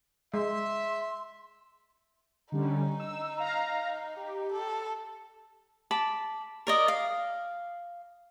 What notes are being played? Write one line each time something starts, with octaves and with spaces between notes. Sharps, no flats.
G#3 E5 C6
D3 G3 C#4 D#4
E6
F5 A#5
G4
A4
A5 B5 D6
A#4 D5 D#5
F5